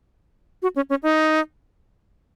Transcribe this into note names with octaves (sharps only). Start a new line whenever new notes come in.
F#4
C#4
C#4
D#4